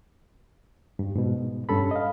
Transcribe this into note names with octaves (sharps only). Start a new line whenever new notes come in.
G2
G#2 B2
G2 C#4 A4 B5
D#5 F5